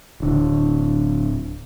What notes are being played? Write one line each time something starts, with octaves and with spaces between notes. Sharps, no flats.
D1 D3